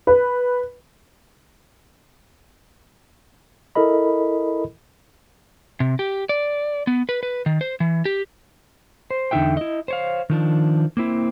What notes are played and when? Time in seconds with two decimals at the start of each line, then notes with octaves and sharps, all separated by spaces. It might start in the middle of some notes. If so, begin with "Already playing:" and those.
0.07 B4
3.75 E4 A4 A#4 D#5 B5
5.80 C3
5.99 G4
6.29 D5
6.87 B3
7.09 B4
7.23 B4
7.46 D#3
7.61 C5
7.80 E3
8.05 G4
9.11 C5
9.31 E2 D3 D#4 F#4 E5 G5
9.57 E4 D#5
9.88 C5 C#5 F5
10.30 D#3 F3 D4
10.97 A#3 C4 E4